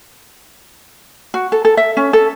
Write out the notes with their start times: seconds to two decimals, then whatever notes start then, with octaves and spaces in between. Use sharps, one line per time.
1.34 F#4
1.52 A4
1.65 A4
1.77 E5
1.97 C#4
2.13 A4